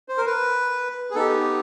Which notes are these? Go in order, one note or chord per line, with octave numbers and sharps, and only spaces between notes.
C5
A#4
B4
G#4
B3 D#4 G4 A4